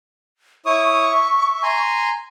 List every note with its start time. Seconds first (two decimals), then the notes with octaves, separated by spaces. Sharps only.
0.66 E4 C#5 C#6 D#6
1.12 E5
1.63 G#5 A#5 C6